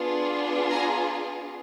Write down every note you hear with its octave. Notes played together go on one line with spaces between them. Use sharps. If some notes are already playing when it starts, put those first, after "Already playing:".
Already playing: B3 D4 F4 G#4
G#5 A#5